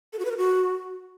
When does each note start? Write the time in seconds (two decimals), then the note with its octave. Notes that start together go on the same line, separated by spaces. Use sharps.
0.13 A4
0.19 F#4
0.25 B4
0.31 A#4
0.37 F#4